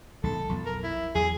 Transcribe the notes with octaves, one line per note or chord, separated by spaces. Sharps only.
B1 D#3 G#3 A4
B1 F2
A#4
E4
E2 F#3 G#4